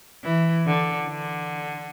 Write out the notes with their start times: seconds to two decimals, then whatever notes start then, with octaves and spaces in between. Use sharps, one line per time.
0.24 E3
0.66 D3
1.09 D3